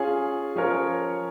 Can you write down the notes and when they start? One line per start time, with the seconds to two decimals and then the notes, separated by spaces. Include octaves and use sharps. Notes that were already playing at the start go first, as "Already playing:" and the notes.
Already playing: C#4 F4 G#4
0.55 F3 C#4 A#4 C#5